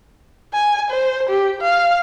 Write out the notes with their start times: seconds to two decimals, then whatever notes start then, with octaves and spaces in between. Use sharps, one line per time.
0.54 G#5
0.91 C5
1.29 G4
1.62 F5